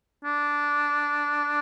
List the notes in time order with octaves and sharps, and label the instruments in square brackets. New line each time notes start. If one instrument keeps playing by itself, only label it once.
[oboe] D4